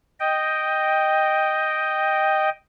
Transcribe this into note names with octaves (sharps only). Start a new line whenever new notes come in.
D#5 G5